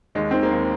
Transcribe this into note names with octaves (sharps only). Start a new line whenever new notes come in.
D#2 G#3
D#3 C4
A#3
D#2